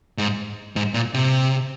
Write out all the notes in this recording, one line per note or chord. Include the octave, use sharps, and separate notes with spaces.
G#2
G#2
A#2
C3